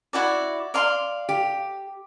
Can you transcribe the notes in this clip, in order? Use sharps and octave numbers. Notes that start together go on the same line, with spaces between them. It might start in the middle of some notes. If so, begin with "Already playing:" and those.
E4 F#4 D5
D5 F5 C6
G4